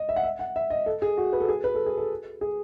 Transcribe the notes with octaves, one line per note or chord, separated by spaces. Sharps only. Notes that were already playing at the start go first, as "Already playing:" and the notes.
Already playing: D#5
E5
F#5
E5
F#5
E5
D#5
A4
G#4
F#4
B4
A4
G#4
B4
A4
G#4
A4
G#4